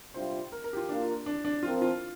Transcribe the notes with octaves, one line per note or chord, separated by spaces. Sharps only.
C3 G3 D4 F4 C5
A#4
A#4
G4
F4
A#3 D4 F4 A#4
D4
D4
F3 C4 F4 A#4
F4